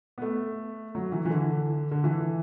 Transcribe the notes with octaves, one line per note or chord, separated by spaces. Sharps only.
B3
A3
F#3
E3
E3
D3
D3
E3